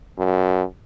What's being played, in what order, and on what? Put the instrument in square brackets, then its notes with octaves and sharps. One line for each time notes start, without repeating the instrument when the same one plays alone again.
[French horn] F#2